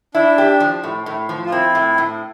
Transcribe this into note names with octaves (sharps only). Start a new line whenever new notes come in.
D4 E4
G4
F3
A2
A2
F3
F4
C4 E4
A2
A2